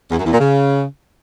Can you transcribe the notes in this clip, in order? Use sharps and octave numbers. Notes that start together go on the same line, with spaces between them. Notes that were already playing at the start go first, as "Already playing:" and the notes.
E2
F#2
E2
A#2
C#3